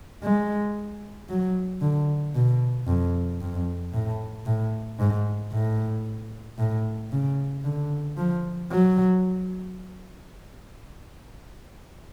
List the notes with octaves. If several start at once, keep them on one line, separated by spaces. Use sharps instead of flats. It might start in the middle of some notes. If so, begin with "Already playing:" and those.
G#3
F#3
D3
B2
F2
F2
A2
A2
G#2
A2
A2
C#3
D3
F3
F#3